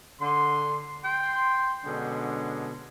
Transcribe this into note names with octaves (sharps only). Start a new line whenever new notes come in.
D3 C6
G5 C6
B2 D3 G#3 C#4 D4